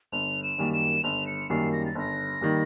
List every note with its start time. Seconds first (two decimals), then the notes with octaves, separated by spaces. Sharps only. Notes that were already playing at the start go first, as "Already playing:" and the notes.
0.12 G1 F7
0.43 E7
0.58 F#2 D#3 G3 A#3
0.73 E7
1.04 G1 F7
1.27 C#7
1.50 F#2 D#3 G3 A#3 C7
1.73 A#6
1.86 A6
1.95 G1 A#6
2.41 D#3 G3 A#3